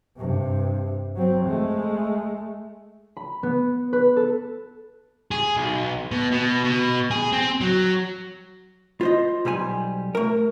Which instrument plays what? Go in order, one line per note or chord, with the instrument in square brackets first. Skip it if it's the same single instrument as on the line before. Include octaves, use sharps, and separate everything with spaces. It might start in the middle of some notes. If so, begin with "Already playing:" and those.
[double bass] G2 C3
F#3 C4
G#3 A3
[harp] B5
B3
B4
A4
[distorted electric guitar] G#4
B1
B2
B2
B2
G#4
C4
F#3
[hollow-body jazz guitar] F4 C5 D#5
B1 G3 C5 G#5
A3 A#4